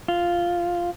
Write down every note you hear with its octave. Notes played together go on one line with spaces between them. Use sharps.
F4